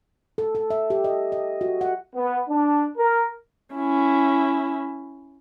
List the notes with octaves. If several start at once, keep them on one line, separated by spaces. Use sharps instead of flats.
A4
A4
E5
G4
D#5
D#5
F#4
F#5
B3
D4
A#4
C#4 E4